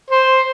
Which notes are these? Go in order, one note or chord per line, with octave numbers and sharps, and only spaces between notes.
C5